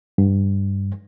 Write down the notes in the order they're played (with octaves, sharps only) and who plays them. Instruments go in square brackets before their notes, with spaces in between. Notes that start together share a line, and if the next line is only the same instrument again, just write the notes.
[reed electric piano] G2